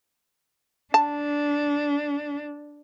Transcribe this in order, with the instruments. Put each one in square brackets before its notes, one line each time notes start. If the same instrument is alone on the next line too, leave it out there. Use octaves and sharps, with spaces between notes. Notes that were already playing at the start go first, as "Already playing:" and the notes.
[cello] D4 [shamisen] A5